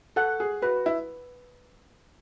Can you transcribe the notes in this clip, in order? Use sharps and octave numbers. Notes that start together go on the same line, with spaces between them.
A4 F#5
G#4
F#4 B4
E4